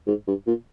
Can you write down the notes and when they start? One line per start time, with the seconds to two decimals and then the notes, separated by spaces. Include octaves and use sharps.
0.07 G#2
0.28 G2
0.47 A#2